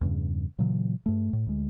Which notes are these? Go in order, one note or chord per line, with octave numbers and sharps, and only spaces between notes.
E2 G2 C#3
A#2 C#3 E3 F#3
G2 A3
A2
D2 G#3